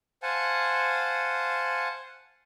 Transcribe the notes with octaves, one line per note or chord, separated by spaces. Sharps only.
C5 F5 F#5 G#5 A5